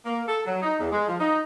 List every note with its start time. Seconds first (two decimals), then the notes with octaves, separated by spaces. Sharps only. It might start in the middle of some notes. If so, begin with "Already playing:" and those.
0.06 A#3
0.28 A4
0.46 F#3
0.62 D#4
0.80 E2
0.92 G#3
1.08 F3
1.20 D#4